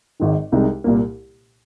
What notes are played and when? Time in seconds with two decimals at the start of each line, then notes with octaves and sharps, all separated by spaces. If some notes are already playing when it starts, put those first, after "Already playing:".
0.20 G#1 G#2 D#3
0.52 C2 C3 G#3 D#4
0.84 C2 A#2 A#3